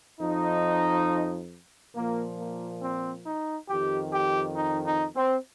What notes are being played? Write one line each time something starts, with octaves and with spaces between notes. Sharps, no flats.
F2 F3 D#4
A#2 F3 A#3
A#3
C4
D#4
F2 D#3 G4
G4
D#4
D#4
C4